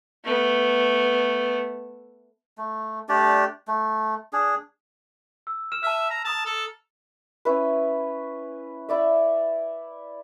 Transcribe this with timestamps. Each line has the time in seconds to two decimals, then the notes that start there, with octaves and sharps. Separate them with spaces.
0.25 A3 B3
2.58 A3
3.09 A3 D4 G4 D5
3.68 A3
4.33 D4 G#4
5.47 E6
5.72 F6 E7
5.83 E5 A5 F6
6.10 A#5
6.25 A5 A#5 D#6 F7
6.46 A4
7.45 C#4 E4 B4
8.89 E4 D5 E5